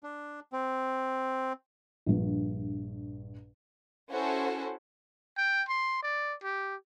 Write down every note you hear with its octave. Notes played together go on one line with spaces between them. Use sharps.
D4
C4
A#1 G2
C#4 E4 F#4 A4 C5 F#5
G5
C6
D5
G4